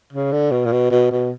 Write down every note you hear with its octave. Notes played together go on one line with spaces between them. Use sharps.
C#3
D3
B2
A#2
B2
B2
B2